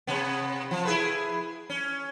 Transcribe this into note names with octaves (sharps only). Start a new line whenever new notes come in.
C3 B3
F3
E4 G#4 B4
C#4